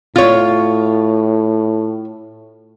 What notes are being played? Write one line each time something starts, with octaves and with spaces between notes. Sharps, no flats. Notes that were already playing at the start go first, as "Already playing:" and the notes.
A2 F4 C#5